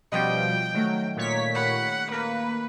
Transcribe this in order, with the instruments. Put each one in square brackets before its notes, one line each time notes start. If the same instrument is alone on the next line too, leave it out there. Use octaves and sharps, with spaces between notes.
[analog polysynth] B2 F3 G3 [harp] C#4 D#5 [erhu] G5
[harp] D#3 A3 [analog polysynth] F#3
[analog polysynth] A#2 C#5 B6
[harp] G4 B5 G6 [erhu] F#5
[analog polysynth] A#3 [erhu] B4